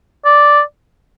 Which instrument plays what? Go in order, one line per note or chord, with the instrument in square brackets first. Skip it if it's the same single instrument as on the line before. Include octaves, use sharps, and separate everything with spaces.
[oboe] D5